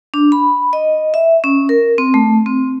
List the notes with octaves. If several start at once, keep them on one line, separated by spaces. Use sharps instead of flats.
D4
B5
D#5
E5
C#4
A#4
C4
A3
C4